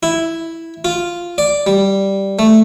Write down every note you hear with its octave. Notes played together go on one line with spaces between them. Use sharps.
E4
F4
D5
G3
A3